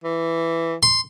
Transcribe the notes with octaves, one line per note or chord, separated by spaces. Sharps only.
E3
C6